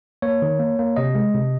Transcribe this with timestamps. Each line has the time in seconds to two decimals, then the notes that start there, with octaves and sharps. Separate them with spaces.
0.22 A#3 C#5
0.42 D#3
0.59 A#3
0.79 A#3
0.96 C3 D#5
1.15 G#3
1.34 C3